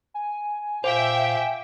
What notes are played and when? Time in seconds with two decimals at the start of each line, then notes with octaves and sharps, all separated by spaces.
0.14 G#5
0.84 A#2 C5 E5 F5 G5 D6